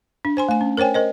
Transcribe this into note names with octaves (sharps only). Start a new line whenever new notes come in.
D4
C5 G#5 C6
A3 G#5
C#4
A#4 C5 C#5 G5 G#5
A#4 C5 D#5